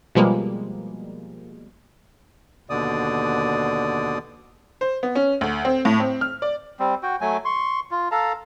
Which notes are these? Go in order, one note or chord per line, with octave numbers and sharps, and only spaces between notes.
B2 F3 G3 G#3 A#3
D#2 B2 D3 D5 D#6
C5
B3
C#4
D2
C4
A2
C4
F6
D5
G3 C4
F#4 G5
F#3 A3 G#5
C6 C#6
F4
A4 F5 A5 A#5